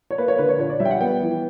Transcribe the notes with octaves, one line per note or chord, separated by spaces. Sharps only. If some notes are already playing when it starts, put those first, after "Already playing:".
C#5
A#3 B4
C#5
D3 B4
C#5
A#2 C#5
D5
G3 E5
G5
F#5
B3 G5
E3